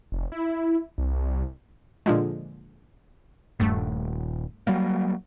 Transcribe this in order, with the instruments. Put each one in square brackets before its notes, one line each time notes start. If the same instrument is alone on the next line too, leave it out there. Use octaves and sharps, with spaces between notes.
[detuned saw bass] F1
E4
C2
[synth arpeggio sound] A#2 D3 F3 G#3
[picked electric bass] D#1 [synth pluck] G2 A3
[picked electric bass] F#3 G3 A#3